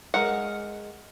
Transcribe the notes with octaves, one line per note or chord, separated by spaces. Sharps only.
G#3 A#4 F#5